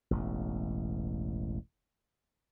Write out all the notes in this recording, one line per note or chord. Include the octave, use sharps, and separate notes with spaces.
E1 A1